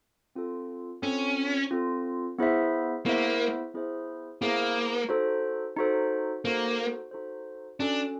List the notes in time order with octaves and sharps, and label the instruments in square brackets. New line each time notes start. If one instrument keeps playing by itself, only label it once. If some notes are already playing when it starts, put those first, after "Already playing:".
[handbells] C4 F4 A4
[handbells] C4 F4 A4 [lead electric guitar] C#4
[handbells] C4 F4 A4
B3 E4 G#4 C5 E5
[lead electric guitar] A#3 [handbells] B3 E4 G#4 C5 E5
[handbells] B3 E4 G#4 C5 E5
[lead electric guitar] A#3 [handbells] B3 E4 G#4 C5 E5
[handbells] D#4 F#4 A4 C5
D#4 F#4 A4 C5
[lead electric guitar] A#3 [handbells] D#4 F#4 A4 C5
[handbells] D#4 F#4 A4 C5
[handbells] C#4 F#4 A4 [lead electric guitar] D4